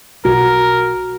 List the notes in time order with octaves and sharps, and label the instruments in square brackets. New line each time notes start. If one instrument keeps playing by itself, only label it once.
[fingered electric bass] B1 [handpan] F#4 [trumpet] A#4